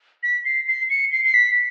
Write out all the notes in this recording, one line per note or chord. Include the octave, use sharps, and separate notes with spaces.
B6
C7
C7
C#7
C7
C7
B6